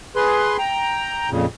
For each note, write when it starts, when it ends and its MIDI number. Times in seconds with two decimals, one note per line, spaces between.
0.16 0.57 68
0.16 0.57 71
0.16 0.57 84
0.58 1.30 79
0.58 1.30 82
1.30 1.46 41
1.30 1.46 46
1.30 1.46 49